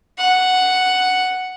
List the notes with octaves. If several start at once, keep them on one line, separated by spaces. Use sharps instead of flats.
F#5